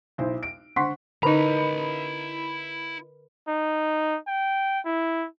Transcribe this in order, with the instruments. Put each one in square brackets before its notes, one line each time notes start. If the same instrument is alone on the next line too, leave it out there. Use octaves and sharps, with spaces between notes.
[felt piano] B1 E4 C5
D7
D3 C5 F#5 C6 C#6 B6
[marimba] D3 D#4 [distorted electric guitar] E4 A#5 [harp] A#4 B4 D#5 [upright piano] B5
[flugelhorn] D#4
G5
E4